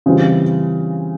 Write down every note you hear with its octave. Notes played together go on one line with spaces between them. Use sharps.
C#3 E3 G3 C4 F4